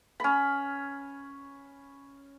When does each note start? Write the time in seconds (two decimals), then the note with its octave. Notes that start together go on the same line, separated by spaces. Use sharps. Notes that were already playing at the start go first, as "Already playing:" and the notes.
0.20 C#4 B5